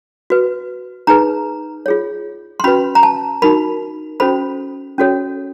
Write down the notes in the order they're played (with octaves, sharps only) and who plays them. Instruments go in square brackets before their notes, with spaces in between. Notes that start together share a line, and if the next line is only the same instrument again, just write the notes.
[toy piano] F#4 B4
D#4 G#4 B4 A#5
F4 G#4 C#5
C6
C#4 F#4 B4 B5
A#5
A5
D#4 F#4 A#4 B5
C#4 F#4 A4 C5 B5
C#4 F#4 A4 C#5